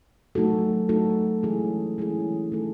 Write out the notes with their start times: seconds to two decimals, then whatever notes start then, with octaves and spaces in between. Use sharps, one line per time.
0.35 F#3 A3 D#4 F#4 A4
0.89 F#3 A3 D#4 F#4 A4
1.43 E3 G#3 C#4 E4 G#4
1.98 E3 G#3 C#4 E4 G#4
2.52 D#3 A3 D#4 A4